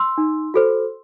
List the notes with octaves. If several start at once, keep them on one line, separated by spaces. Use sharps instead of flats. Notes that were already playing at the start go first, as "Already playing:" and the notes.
Already playing: C6 E6
D#4
F#4 A4 C5